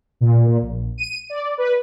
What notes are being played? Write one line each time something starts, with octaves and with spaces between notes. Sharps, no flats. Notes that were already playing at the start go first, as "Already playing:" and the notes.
A#2
A#2
A#1
D#7
D5
B4